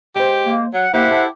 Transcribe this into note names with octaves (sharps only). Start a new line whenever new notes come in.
G#3 G4 C5
A#3
F#3 F#5
A#3 E4 G4 C5 E5 F#5
G4 A4